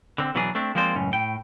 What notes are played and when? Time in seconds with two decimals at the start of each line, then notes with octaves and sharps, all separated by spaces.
0.18 D3 C4
0.35 B2 E3 F#3 D4 G#4
0.55 A3 C4 D4
0.75 F3 G#3 A#3 C4 C5 D5
0.95 C#2 F#2 A2 C#4
1.12 A2 G5